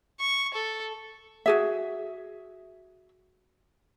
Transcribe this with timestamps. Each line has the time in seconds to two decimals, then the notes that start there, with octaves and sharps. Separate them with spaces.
0.20 C#6
0.54 A4
1.46 F#4 G#4 E5